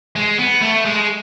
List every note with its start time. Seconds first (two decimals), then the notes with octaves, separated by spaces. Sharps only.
0.16 G#3
0.38 B3
0.61 A3
0.85 G#3